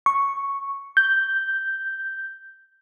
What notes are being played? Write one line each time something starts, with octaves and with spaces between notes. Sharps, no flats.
C#6
G6